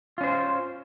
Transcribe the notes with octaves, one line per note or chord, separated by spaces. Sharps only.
C#4 F4 C5